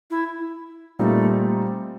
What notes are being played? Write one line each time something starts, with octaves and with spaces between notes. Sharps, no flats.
E4
A#2 G3 A3 C4 D#4